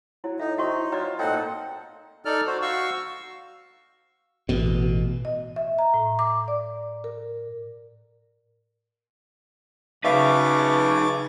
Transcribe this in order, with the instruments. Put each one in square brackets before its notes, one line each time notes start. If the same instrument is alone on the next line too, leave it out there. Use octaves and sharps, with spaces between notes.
[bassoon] F#3 [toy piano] E4
[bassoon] A2 [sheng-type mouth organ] D#4 [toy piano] E5
[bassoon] C3 [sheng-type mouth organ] D#4 [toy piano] E4 F#4 C#6
[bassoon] F#3 [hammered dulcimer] F4 [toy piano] D5 A#5
[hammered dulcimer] A#2 D#4 [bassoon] C4 [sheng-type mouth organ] A4 F#5
[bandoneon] D#4 A4 D5 F6
F#4 C5
F#4 F5 C#6 E6
[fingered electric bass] A1 B2
[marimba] D#5
E5
A#5
A2
D6
D5
A#4
[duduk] C#3 [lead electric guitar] D#4 B4 [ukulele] E5 F5 [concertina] A5 C#6 D6